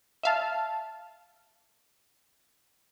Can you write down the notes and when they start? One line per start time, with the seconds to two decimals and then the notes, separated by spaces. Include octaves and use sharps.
0.23 E5 F5 A5